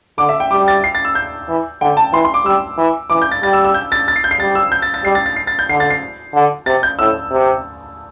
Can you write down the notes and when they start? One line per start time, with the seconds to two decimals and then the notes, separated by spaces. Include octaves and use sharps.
0.18 D3 D6
0.29 E5
0.40 G5
0.51 G3 D6
0.68 A6
0.84 C7
0.95 A6
1.05 E6
1.15 G6
1.48 E3
1.81 D3 G5
1.97 A5
2.13 E3 C6
2.24 C6
2.34 D6
2.45 G3 E6
2.78 E3
3.10 E3 D6
3.22 G6
3.31 A6
3.43 G3 A6
3.53 E6
3.65 E6
3.74 G6
3.92 A6
4.08 A6
4.16 C7
4.24 G6
4.31 C7
4.40 G3 A6
4.55 E6
4.72 G6
4.82 A6
4.94 A6
5.04 G3 C7
5.15 A6
5.26 A6
5.36 C7
5.47 A6
5.59 G6
5.69 D3 C7
5.80 A6
5.90 C7
6.34 D3
6.66 C3 A6
6.83 G6
6.99 A2 E6
7.31 C3